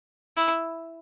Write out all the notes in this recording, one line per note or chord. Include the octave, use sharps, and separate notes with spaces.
E4